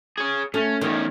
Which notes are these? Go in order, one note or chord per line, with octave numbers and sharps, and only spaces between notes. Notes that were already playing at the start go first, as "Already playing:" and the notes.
G#4 C#5
A3 C#4
E2 D#3 C#4